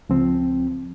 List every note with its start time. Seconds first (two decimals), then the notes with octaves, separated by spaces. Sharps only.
0.09 C#2 F3 C4